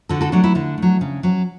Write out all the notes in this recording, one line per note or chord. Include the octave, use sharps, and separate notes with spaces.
D3 F#4 A4
F#4 A4
F#3 A3 D4 F#4
E4
D3 D4
F#3 A3
C#3
F#3 C#4